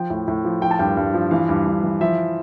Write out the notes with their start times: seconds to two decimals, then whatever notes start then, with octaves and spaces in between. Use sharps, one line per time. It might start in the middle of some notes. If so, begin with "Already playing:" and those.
Already playing: F3 G5
0.10 A2
0.28 A2
0.45 F3
0.62 F3 G5
0.71 A5
0.79 G2 G5
0.97 G2
1.14 F3
1.31 E3 F5
1.49 G2
1.66 G2
1.84 E3
2.01 F3 E5